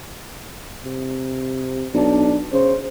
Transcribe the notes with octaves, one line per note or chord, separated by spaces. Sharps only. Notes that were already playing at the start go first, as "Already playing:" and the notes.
C3
B1 D4
C#3 C5